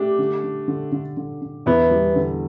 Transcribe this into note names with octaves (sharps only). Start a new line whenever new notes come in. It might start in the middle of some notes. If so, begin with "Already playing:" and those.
Already playing: A3 D4 G4
D3
D3
D3
D3
D3
D3
E2 B3 E4
G3
D3